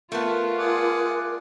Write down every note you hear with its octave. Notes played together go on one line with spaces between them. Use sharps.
A3 B3 F4 A#4
G#4 D5 F#5